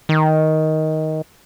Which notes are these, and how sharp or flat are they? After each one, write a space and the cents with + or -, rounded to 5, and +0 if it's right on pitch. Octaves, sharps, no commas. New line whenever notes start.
D#3 +10